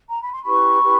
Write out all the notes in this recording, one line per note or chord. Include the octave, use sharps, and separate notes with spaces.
A#5
B5
C6
C#4 E4 G4 B4 B5 C#6
C#4 E4 G4 B4